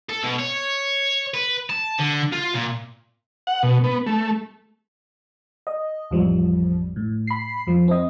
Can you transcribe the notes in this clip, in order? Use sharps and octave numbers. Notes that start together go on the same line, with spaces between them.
A4
B2
C#5
B4
A5
D3
F4
A#2
F#5
B2
B3
A3
D#5
A1 F2 F3 G3
A2
B5 C7
F2 F3
C4 D#5